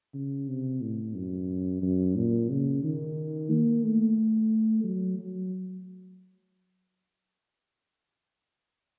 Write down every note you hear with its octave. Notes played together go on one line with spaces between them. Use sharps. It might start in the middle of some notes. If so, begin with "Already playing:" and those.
C#3
C3
A2
F#2
F#2
A#2
C#3
D#3
A#3
A3
F#3
F#3